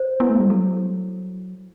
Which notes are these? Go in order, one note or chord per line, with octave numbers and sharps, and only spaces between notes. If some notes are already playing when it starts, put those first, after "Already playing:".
Already playing: C5
B3 E4
A3
G3
F#3 A4